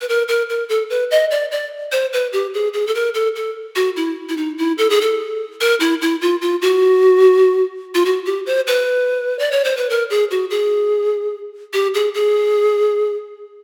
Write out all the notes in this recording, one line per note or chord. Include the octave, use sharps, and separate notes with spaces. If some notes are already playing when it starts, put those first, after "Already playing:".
B4
A#4
A#4
A#4
A4
B4
D#5
D5
D5
C5
B4
G4
G#4
G#4
A4
A#4
A4
A4
F#4
E4
E4
D#4
E4
A4
G#4
A4
A#4
E4
E4
F4
F4
F#4
F4
F#4
G4
C5
B4
D5
C#5
C5
B4
A#4
G#4
F#4
G#4
G4
G#4
G#4